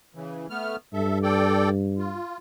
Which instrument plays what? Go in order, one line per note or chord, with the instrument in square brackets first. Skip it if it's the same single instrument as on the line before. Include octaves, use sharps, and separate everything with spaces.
[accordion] C#3 E3
A3 B3 F6
[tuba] G2 [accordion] A4 E5
[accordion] A4 D5 G5
F4